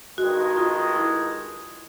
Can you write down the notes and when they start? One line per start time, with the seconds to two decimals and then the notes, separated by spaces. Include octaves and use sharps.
0.18 G2 D#3 G#3 F#4
0.57 F4
0.96 E4